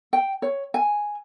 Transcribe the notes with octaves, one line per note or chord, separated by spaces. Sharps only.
G5
C#5
G#5